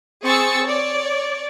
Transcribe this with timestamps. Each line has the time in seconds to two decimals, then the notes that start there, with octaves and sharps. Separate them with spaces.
0.23 C4 G#4 C#6 E6 A6 C#7
0.63 C#5 D5